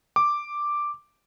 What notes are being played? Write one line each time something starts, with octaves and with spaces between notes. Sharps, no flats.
D6